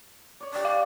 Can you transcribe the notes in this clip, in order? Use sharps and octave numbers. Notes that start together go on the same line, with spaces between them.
C#5 D5
G4 D5 D#5
F5